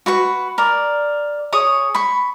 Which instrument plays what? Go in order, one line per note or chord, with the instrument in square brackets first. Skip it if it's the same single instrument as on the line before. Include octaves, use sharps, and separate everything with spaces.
[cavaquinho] F#4 B4 C#6
A#4 D5
G#4 C#5 C#6 D#6
B5 C#6